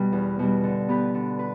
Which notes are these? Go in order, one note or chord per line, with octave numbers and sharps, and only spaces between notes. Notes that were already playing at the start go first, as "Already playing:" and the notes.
Already playing: B2 G3
E2
B2 G3
D3
B3 G4 B4
D3
B4